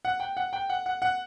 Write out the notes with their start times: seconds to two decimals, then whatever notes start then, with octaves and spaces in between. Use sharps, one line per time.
0.05 F#5
0.20 G5
0.37 F#5
0.53 G5
0.70 F#5
0.86 F#5
1.02 F#5